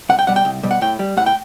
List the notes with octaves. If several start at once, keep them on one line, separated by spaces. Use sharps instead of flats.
C2 F#5
G5
B2 G3 F#5
G5
C2
B2 G3
F#5
A2 G5
G3
A2 F#5
G5